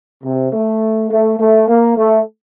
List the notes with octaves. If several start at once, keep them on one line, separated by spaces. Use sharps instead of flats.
C3
A3
A3
A3
A#3
A3